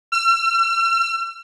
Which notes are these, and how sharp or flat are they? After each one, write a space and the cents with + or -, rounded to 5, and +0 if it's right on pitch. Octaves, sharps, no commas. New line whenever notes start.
E6 +45